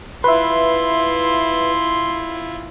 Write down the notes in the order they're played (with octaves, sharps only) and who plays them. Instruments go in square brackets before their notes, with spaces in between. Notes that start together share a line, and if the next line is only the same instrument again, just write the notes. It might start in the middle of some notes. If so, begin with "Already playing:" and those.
[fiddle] E4 F4 [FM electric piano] B4 E5 [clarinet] C6